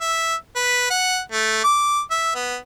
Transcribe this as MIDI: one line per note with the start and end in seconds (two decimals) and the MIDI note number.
0.02 0.35 76
0.56 0.90 71
0.90 1.19 78
1.32 1.60 57
1.64 2.01 86
2.11 2.30 76
2.35 2.57 59